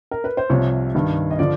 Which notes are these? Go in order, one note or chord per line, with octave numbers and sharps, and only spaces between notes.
A#4
B4
C5
C2 C3 F3 C#5
G2 D#3
D#5
D3 F3 D5